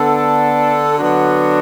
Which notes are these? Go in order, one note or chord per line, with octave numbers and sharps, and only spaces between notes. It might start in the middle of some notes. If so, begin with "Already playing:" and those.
Already playing: D3 B3 D4 A4
D3 F#3 B3 D4 F#4